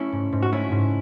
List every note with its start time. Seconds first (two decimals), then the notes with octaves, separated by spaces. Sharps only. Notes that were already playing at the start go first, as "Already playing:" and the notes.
Already playing: A3 C#4 E4
0.12 G#2
0.33 G#2
0.43 F#4
0.52 A3 C#4 E4
0.72 G#2